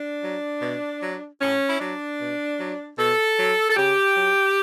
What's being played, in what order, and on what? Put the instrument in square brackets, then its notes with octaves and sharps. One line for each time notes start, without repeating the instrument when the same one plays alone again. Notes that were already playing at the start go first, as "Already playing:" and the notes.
Already playing: [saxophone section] D4
F#3
B2
F#3
A2 C#4
E4
F#3 D4
B2
F#3
B2 A4
F#3
A4
C#3 G4
F#3